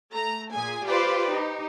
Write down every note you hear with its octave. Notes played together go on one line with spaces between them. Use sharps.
A3 A#5
A#2 G#4 G#5
F4 G4 B4 C5 D5 G5
D#4 G4